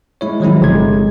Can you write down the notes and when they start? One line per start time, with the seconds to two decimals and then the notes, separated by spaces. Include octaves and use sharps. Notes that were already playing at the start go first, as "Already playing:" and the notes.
0.21 G#3 E4 C#5
0.40 D#3 F3 F#3 G#3 C4 E4
0.61 G1 C3 G#3 G#6